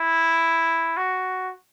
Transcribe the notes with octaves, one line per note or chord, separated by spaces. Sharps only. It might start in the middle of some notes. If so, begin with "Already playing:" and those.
Already playing: E4
F#4